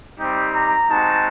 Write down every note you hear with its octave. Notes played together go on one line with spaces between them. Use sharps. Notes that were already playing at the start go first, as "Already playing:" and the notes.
G3 C4 D#4 G4
A#5
G#3 C4 D#4 F#4 A5